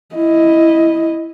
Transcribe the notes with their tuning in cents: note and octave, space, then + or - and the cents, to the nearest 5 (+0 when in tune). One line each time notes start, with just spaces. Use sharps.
E4 +0 D#5 +5